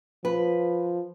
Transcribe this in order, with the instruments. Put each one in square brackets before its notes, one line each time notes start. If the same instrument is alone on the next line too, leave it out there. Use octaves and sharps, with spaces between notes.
[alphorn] F3 [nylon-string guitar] B4